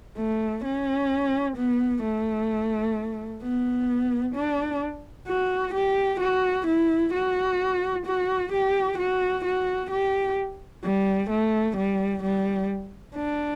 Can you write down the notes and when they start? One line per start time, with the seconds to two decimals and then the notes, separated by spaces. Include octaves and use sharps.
0.17 A3
0.64 C#4
1.57 B3
2.03 A3
3.42 B3
4.35 D4
5.28 F#4
5.74 G4
6.20 F#4
6.67 E4
7.13 F#4
8.06 F#4
8.52 G4
8.98 F#4
9.45 F#4
9.91 G4
10.84 G3
11.30 A3
11.77 G3
12.23 G3
13.15 D4